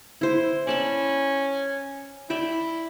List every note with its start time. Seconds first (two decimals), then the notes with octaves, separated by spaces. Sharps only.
0.21 E4 C5
0.67 C#4 D5 A5 B5
2.30 E4 D5 E5 G5